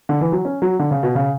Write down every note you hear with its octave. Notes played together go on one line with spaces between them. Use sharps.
D3
E3
F#3
C#4
F#3
D3
C#3
B2
C#3